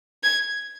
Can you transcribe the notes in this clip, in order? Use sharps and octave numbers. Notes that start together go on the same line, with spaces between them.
G#6